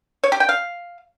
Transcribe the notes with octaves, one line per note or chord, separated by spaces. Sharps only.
C#5
G4
G5
F5